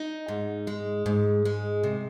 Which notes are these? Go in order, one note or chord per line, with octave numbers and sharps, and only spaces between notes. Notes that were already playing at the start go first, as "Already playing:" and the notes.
Already playing: D#4
G#2
G#3
G#2
G#3
C3